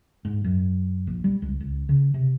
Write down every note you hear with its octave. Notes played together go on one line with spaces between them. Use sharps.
G#2
F#2
A#1
G3
C#2
C#2
C#3
C3